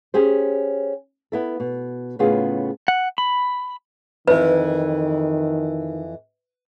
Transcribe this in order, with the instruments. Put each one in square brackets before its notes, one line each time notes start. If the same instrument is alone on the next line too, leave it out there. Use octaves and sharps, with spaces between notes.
[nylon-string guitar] C#4 G4 G#4 C5
B3 E4 A4
B2
A2 C#3 B3 C#4 F4 G#4
[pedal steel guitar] F#5
B5
[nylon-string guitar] F2 E3 [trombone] D#3 [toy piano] B4